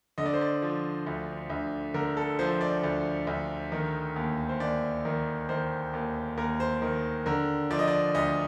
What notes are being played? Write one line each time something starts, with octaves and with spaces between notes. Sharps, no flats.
D3 D#5
D5
C5
D5
F3
D2
D2
D3 A#4
A4
F3 C5
D5
D2
D2
D#3
D#2
C5
D#2 D5
D#3
D#3 C5
D#2
D#2 A#4
C5
D#3
D3 A#4
F3 D5
D#5
D5
D2 D#5